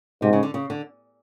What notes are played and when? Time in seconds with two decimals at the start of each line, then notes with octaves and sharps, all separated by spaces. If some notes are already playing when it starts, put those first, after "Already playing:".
0.22 G#2 C3
0.33 C#3
0.43 D3
0.54 C#3
0.70 D3